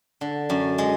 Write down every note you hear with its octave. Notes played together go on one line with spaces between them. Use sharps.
D3
F#2
G#3